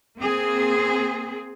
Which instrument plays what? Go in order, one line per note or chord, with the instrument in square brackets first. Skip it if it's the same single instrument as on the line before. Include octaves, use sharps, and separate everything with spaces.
[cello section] A#3 C4 G#4